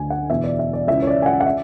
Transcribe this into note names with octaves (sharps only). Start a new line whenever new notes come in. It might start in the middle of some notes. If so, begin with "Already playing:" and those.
Already playing: D2 D3 G#5
F#5
E2 B2 E5
D5
E5
D5
C#2 C#3 E3 E5
C#5
D5
G#5
F#5
F#5
E5